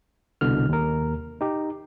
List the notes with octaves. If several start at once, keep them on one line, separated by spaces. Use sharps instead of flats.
C2 B2 D3 F6
D#2 A#4
D#4 G4